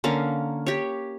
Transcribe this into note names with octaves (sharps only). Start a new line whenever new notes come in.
D3 A#3 C#4 F5
G4 C#5